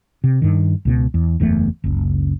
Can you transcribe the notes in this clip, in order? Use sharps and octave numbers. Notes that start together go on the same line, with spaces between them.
C3
G2 D#3
C#2 B2 B3
E2
F#1 E2 C#3 A3
F#1 C#2